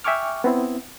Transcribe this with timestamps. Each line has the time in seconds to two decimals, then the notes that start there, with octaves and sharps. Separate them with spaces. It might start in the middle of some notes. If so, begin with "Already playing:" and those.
0.04 E5 G5 G#5 C#6 D6 F6
0.44 B3 C4 E4